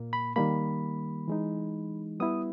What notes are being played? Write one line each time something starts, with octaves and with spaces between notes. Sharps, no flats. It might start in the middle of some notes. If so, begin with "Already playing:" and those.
Already playing: A#2 A#3
B5
D#3 G3 A#3 B5
E3 G#3 D#4
G3 B3 E4 D#6